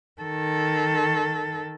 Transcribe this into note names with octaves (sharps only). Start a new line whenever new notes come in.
D#3 A4